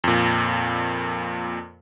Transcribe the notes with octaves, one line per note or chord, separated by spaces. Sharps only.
F2 A#2